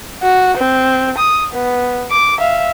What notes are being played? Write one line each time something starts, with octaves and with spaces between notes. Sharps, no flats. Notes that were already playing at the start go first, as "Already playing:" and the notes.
F#4
C4
D#6
B3
D6
E5 F5